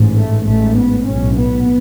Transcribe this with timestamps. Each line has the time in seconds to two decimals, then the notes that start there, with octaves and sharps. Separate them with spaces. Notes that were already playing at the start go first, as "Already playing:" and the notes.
Already playing: A1 G#2
0.15 A3
0.46 A1 G#2 A3
0.77 B3
1.07 B1 A2 C#4
1.38 B3